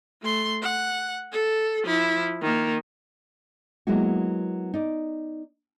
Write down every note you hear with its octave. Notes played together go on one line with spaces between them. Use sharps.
A3 C6
F#5
A4
F3 E4
D#3 A#3
F#3 G#3 A#3 B3 E4 F#4
D#4 D5